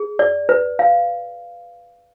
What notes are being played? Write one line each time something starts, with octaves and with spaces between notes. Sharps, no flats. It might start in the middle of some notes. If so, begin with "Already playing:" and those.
Already playing: G#4
D5
B4
F5